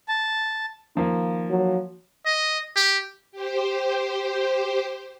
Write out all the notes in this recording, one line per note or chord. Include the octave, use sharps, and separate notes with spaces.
A5
D#3 F3 A#3
F#3
D#5
G4
G4 C5